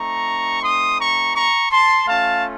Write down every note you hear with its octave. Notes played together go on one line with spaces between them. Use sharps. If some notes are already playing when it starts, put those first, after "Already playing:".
Already playing: A3 C4 D#4 A#5 C#6
C6 D#6
A#5 C#6
A#5 C#6
A5 C6
A3 C#4 F4 F5 A5